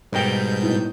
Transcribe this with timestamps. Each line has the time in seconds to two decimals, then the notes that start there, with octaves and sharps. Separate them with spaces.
0.12 G#2 B2 G3 A#4 G5 G6
0.63 A2 B3 D#4